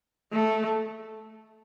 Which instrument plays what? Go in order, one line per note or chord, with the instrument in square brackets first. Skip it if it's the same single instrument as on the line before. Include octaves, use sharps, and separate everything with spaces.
[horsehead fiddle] A3